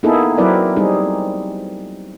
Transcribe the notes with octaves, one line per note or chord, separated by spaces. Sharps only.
A#3 B3 D#4 E4 G#4 A4
F#3 C4 E4 A#4 B4 D5
G3 C4 D#4 G#4